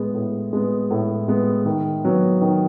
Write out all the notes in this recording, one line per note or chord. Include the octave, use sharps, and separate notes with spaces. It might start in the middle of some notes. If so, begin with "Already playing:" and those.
Already playing: A2 G#3 B3
A2
G#3 B3
A2
G#3 B3
D#3
F#3 B3
D#3